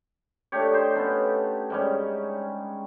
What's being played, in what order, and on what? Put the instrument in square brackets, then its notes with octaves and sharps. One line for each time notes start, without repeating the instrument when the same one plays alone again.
[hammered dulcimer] A3 D4 G4 C#5
D#4 G4 C5
B3 C#4 A4
G#2 G3 C#4